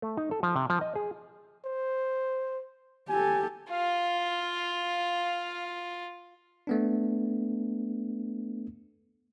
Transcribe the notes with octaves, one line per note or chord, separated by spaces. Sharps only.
A3
D#4
A4
F3
C3
F3
D#5
G#4
C5
G4 A4 G#5
F4 F5
A3 B3 D4